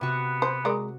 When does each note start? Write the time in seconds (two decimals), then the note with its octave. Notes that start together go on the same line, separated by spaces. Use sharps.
0.01 C3 B3 F#4
0.42 C5
0.65 G#3 A#4 D5